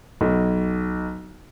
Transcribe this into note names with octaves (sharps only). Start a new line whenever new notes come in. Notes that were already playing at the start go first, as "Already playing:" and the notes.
B1